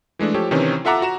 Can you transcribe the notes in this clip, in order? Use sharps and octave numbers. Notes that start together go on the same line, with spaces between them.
E3 G#3 A3 D4
F3 G4 A4 C#5
C3 D#3 E3 C4 C#4
F4 A4 E5 F#5 A#5 D6
F#4 A#5 E7